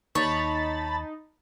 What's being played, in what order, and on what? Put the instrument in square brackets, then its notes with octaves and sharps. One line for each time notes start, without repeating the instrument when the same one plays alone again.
[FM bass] D#2 [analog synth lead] D#4 [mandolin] C#5 [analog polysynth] A5 B5 A6